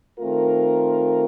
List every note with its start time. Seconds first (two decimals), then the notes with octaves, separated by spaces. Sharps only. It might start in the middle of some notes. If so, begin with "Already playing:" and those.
0.19 D#3 A3 C4 F4 A#4